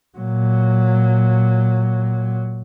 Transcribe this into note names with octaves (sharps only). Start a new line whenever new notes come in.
A#2 F#3